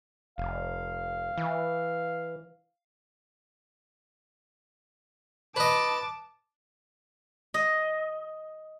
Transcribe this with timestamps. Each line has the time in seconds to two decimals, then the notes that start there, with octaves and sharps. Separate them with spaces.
0.38 F1 F5
1.38 E3
5.56 B4 D#5 A5 D6
7.54 D#5